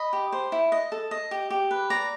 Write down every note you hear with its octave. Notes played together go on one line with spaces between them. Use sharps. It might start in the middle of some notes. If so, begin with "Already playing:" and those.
Already playing: D#5 B5
G4
C5
E4
D#5
A4
D#5
G4
G4
B4
D5 A#5